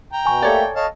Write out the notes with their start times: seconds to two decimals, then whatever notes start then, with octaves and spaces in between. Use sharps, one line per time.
0.13 G5 A#5
0.26 B2 G#5 C#6
0.42 A3 A#3 G4 A4 C#5 D5
0.76 A4 C#5 D#5 F5 A5